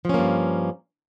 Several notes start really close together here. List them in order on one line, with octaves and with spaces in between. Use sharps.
F3 C#4 A#3 G2